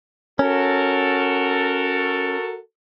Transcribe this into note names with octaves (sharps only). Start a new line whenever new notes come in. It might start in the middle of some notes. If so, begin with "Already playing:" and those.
C#4 F#4 A4 A#4